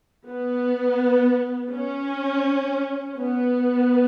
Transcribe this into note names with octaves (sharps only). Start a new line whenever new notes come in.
B3
C#4
B3